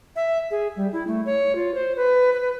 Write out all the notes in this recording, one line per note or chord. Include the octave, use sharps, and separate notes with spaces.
E5
G#4
G3
E4
A3
C#5
F4
C5
B4
B4